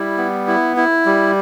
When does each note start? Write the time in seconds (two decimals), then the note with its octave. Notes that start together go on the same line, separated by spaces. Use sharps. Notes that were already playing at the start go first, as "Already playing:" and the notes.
Already playing: G3 E4
0.18 B3
0.48 E4
0.77 E4
1.06 G3